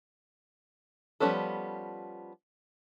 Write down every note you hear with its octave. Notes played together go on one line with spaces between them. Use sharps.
F3 G3 B3 C#4 A4